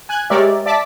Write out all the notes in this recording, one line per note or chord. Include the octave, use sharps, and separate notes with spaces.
G#5 F#6 G#6
G#3 G4 A#4 C#5 D5 E5
D5 E5 A5 D6 B6